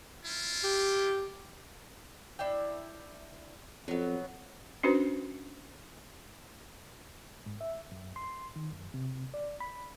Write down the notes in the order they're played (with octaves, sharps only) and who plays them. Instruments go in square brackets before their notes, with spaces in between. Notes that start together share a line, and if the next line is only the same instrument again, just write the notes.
[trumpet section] E4 F4
[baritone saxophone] G4
[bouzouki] D4 E4 G5
[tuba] F2 [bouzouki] F#3 B3
[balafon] C#4 D4 F#4 B4 C5
[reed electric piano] G#2
E5
F#2
C6
D#3
F#2
C3
D5
B5